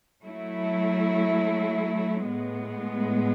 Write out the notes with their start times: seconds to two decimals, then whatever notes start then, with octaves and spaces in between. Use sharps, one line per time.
0.23 F#3 A3 E4
2.27 A2 G#3 B3